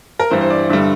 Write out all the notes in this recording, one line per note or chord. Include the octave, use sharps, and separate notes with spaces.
A#4
G2 E3 G3 C5
C5
D5
G2 D3 G3 E5